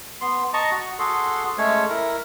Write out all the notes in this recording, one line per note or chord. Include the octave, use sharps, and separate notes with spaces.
B3 C6
D#5 A5 A#5 C#6
F#4
F#4 G#4 A4 C6
G#3 A3 C#4 C#5
E4 A#4